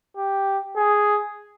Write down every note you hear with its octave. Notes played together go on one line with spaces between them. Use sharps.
G4
G#4